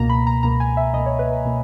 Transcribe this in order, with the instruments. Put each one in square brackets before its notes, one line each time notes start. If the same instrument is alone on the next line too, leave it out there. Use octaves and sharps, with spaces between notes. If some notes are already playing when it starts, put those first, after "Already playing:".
Already playing: [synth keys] C#2 B2 A#3 A#5
B5
A#5
C#2 B2 A#3 A#5
G#5
E5
C#2 B2 A#3 D#5
C#5
B4
B4
B2 A#3